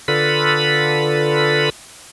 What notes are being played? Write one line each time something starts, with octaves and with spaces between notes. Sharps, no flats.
D3 F4 A4 B4 B5